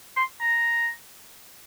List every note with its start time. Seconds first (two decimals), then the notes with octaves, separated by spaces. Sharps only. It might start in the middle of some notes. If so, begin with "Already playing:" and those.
0.16 C6
0.40 A#5